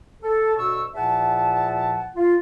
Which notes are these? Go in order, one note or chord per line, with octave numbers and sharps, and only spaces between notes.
A4
D2 B2 A4 C#6 E6
E2 A#2 F3 E5 F#5 A5
F4